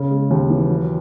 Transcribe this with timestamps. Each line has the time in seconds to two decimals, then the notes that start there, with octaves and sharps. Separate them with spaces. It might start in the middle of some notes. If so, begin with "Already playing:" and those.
Already playing: C#3
0.11 G#3
0.30 D#2
0.50 E3
0.70 F#3